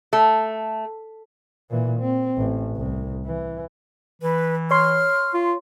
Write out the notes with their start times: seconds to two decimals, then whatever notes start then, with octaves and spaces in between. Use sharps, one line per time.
0.13 A3
1.71 A#2 E3
2.00 C4
2.37 A1
2.76 C2
3.25 E3
4.22 E3 B4
4.71 C#5 C6 F6
5.34 F4